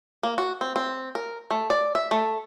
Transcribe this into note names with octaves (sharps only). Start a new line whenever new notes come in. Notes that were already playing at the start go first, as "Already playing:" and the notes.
A#3
F#4
C4
C4
A#4
A3
D5
E5
A3